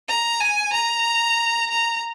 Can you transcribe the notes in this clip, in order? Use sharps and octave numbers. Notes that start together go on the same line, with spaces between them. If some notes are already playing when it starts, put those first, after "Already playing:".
A#5
G#5
A#5
A#5